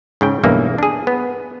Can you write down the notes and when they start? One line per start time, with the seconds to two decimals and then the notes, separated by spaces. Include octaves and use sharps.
0.21 G#2 C#3 G5
0.43 B1 E2 G2 E3 A#3
0.78 D4 G#4
1.07 B3